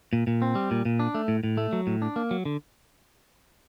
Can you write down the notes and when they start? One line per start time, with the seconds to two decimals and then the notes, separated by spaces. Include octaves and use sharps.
0.13 A#2
0.27 A#2
0.42 C4
0.55 G3
0.71 A#2
0.85 A#2
1.00 D4
1.15 A3
1.28 A2
1.43 A2
1.57 A3
1.73 F#3
1.87 A2
2.02 D4
2.16 A#3
2.31 F#3
2.45 D3